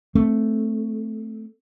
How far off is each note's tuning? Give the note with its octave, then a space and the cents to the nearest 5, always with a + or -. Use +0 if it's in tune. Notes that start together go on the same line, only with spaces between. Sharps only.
A3 +0 C4 +0